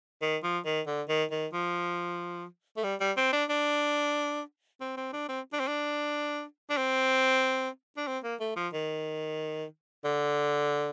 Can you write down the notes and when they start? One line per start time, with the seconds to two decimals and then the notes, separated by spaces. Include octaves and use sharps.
0.22 D#3
0.43 F3
0.66 D#3
0.87 D3
1.09 D#3
1.31 D#3
1.53 F3
2.77 A3
2.84 G3
3.00 G3
3.17 C4
3.33 D4
3.49 D4
4.81 C4
4.97 C4
5.13 D4
5.29 C4
5.53 D4
5.60 C4
5.67 D4
6.70 D4
6.77 C4
7.97 D4
8.07 C4
8.24 A#3
8.40 A3
8.56 F3
8.73 D#3
10.05 D3